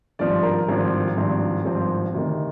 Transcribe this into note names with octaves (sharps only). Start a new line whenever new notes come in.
G#1 G2 F3 C4 D5
A#4
G#1 G2 F3 C4
G#1 G2 F3 C4
G#1 G2 F3 C4
D2 C3 D#3